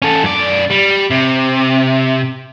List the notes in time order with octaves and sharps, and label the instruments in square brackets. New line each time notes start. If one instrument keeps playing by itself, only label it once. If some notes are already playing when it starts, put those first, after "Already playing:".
[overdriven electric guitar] C#4 A4
F#2 D5
G3
C3